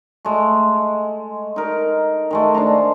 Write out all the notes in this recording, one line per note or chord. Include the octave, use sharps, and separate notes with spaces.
G#3 A3
D#4 A#4
D#3 G#3 A3
D4 C5 A5 A#5